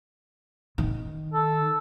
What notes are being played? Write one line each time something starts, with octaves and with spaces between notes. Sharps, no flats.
D#3
A4